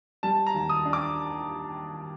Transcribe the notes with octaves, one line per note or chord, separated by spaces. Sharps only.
G3 A5
A#5
D#2
D#6
D4
D6